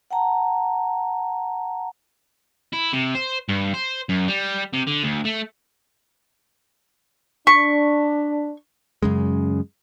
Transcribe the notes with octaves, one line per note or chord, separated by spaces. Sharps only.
F#5 G5 A5 A#5
E4
C3
C5
G2
C5
F#2
G3
C3
D3
D2
A3
D4 C#6 B6
F#2 C#3 G#3